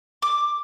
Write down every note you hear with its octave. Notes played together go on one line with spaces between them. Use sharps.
D6